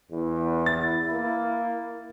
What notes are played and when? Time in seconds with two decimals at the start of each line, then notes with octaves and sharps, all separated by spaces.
0.11 E2 E4
0.66 A6
1.11 A#3